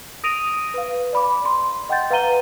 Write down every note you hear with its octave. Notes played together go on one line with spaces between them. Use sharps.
D#6 A#6 D7 D#7 F7
B4 F5
D5 B5 D6
C6
D#5 F#5 G5 C6 G6 A6
B4 F5 F#5 A#5 D#7 G7